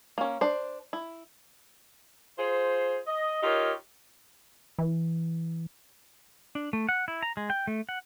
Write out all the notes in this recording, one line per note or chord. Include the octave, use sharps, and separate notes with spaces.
A#3 C#4
D4 C5
E4
F4 G#4 C5
D#5
D#4 F4 G4 A#4 C#5
E3
D4
A3
F#5
E4
A#5
G#3
G5
A3
F#5